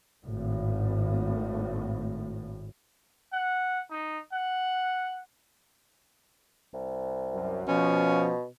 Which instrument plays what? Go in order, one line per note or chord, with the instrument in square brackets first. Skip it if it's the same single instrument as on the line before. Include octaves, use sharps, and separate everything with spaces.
[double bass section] G#1 A2
[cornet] F#5
D#4
F#5
[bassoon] C2
[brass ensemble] F#2
[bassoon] B2 [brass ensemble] F3 [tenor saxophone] C#4